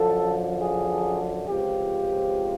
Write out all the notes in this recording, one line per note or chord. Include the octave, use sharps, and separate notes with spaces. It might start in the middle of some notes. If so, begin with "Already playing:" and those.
Already playing: F#2 D3 F3 A4
G#4
C#2 C3 F3 G4